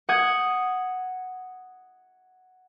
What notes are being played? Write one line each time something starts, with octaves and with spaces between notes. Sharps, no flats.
F#5 D#6 G#6